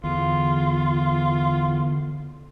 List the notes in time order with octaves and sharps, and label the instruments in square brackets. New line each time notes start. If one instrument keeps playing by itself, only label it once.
[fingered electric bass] E2 [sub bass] D3 [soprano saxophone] F4